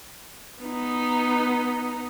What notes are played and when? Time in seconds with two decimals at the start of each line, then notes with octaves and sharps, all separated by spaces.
0.62 B3 D#4